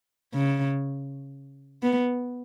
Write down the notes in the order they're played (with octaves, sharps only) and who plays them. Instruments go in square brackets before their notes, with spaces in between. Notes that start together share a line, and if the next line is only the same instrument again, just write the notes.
[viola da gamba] C#3
B3